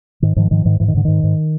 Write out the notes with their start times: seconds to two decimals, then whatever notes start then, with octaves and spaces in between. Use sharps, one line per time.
0.22 G#2 D#3
0.36 G#2 D#3 F3
0.51 G#2 D#3 F3
0.65 G#2 D#3
0.80 G#2 E3
0.88 D#3
0.94 G#2 D3
1.05 G#2 D#3
1.23 G#2